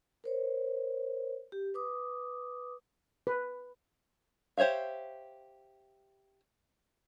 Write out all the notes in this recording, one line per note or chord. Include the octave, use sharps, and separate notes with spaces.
A#4 C5 C#5
G4
B4 D6 D#6
B4
G4 C5 C#5 E5 F5